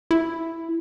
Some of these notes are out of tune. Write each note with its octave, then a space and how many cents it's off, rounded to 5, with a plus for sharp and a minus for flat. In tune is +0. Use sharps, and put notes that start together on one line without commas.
E4 +5